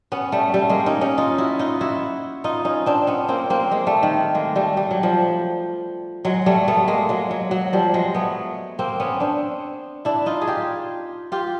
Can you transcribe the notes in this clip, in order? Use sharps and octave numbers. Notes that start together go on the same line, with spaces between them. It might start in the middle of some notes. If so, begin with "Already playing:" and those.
B3 C#4
G3 A3
G3 A3
G#3 A#3
C#4 D#4
C#4 D#4
D#4 F4
E4 F#4
D#4 F4
E4 F#4
D#4 F4
C#4 D#4
C4 D4
B3 C#4
A#3 C4
A#3 C4
G#3 A#3
G3 A3
D#3
G#3 A#3
G3 A3
G3
F#3
F3 G3
F#3 G#3
G3 A3
A3 B3
G#3 A#3
F#3 G#3
F#3
F#3
F3 G3
F#3 G#3
A3 B3
A#3 C4
B3 C#4
C4 D4
D4 E4
D#4 F4
G#4
F4 G4
F4 G4